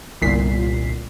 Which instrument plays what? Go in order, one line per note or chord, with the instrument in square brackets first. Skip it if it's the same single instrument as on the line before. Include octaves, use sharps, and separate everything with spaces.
[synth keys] G1 C2 A#2 B6 C7